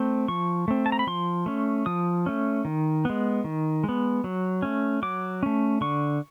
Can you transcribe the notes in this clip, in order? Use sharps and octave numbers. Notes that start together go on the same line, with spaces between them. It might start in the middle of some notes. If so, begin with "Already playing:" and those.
Already playing: A3 C4
F3 C#6
A3 C4
A5
A#5
B5
F3 C6
A3 C#4
F3 D#6
A3 C#4
D#3
G#3 B3
D#3
G#3
B3
F#3
A3 C#4
F#3 D6
A3 C#4
D3 C#6